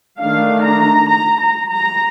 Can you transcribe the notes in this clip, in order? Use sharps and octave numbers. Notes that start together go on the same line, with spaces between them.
D#3 A3 D4 F5
A#5
A#5
A#5
A#5